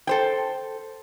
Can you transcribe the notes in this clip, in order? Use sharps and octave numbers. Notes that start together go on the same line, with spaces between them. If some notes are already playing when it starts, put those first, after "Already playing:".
A4 C5 G5